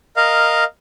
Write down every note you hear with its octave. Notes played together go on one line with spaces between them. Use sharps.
A#4 D#5 F5